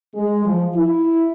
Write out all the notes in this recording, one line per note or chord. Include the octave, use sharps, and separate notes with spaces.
G#3
F3
E4